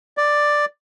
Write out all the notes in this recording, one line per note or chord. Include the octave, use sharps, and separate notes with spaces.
D5